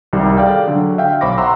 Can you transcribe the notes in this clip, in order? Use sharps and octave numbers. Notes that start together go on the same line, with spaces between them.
C2 C3 D#3 G3
G#4 A4 D5 F5 G5
D3 F#3
E5 F5 G5
B1 C5 B5 C#6 D6 A#6
E5 F#5 A#5 C6 E6